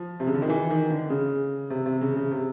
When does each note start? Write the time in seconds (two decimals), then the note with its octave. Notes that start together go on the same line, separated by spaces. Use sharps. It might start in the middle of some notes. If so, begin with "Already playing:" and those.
Already playing: F3
0.20 C3
0.27 C#3
0.34 D3
0.42 D#3
0.49 E3
0.70 D#3
0.90 D3
1.10 C#3
1.70 C3
1.86 C3
2.01 C#3
2.16 C#3
2.31 C3